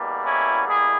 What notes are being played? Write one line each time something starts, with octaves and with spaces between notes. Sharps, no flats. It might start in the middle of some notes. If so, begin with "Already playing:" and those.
Already playing: E2 B2 G3 A#3
C#4 E4
E4 G#4